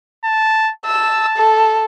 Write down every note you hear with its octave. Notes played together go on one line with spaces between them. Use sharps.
A5
A5 E6
A4